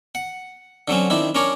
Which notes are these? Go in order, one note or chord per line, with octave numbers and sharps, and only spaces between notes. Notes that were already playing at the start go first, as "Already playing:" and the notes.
F#5
D3 F#3 C4 C#4
D#3 C4 D4 E4
C#4 D4 A#4 C#5 D5